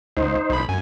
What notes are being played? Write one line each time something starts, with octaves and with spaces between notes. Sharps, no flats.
C#2 D#4 C5
B1 B5
F#2 G#5